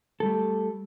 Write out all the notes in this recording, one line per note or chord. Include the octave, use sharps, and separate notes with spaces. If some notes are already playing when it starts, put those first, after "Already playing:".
G3 A3 A4